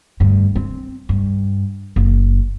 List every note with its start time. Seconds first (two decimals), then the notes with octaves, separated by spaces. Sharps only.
0.20 D2 G2
0.56 C4
1.09 G2
1.96 F#1